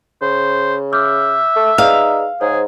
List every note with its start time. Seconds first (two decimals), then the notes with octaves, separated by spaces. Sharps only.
0.22 C#3 C5
0.93 E5 D6 F6 G6
1.56 A3
1.78 D#4 G#4 B4 D5 F5
2.41 G#2 G#4 C5 C#5